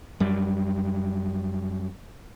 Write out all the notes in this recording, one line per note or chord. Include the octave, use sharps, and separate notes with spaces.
F#2 G3